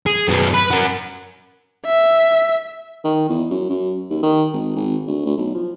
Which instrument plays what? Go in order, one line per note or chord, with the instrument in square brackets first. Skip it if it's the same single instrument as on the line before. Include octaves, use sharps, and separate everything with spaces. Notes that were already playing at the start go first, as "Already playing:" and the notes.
[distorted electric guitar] G#4
F#2 B3
B4
F#4 A#4
[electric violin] E5
[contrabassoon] D#3
E2
F#2
F#2
D#2
D#3
G#1
G#1
D2
D2
B1
F3